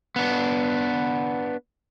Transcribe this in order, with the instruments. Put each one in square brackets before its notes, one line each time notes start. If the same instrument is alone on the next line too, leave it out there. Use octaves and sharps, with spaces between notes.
[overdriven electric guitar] B3 D4